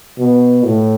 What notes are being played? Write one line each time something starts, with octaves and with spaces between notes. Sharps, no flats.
B2
A2